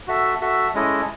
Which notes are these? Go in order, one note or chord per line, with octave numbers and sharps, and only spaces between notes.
F#4 A4 E5
F#4 A4 E5
G#3 C#4 E4 A4 D#5